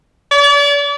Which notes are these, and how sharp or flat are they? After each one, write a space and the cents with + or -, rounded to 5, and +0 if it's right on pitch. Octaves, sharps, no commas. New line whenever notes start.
D5 -40